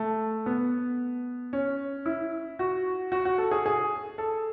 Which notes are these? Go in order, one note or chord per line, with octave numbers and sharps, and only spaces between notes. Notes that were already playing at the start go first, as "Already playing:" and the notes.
Already playing: A3
B3
C#4
E4
F#4
F#4
F#4
A4
G#4
G#4
A4